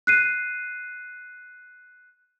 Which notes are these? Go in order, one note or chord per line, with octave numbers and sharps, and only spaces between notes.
F#6 C7 D#7